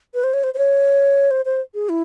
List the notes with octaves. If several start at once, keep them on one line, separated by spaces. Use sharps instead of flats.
B4
C5
C#5
C5
C5
C#5
C5
C5
G#4
E4